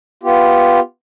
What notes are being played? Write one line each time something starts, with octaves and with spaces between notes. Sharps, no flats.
B3 F4 G4